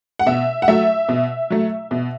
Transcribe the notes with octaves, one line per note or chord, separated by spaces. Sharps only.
F#5
B2 E5
F#5
F#3 A3 E5
B2
F#3 A3
B2